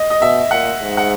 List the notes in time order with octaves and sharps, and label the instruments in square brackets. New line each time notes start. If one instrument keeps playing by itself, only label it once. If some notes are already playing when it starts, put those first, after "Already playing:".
Already playing: [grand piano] D#5
D#5
[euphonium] B2 [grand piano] E5
[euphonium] A#2 [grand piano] F#5
[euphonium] G#2
[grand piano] F#5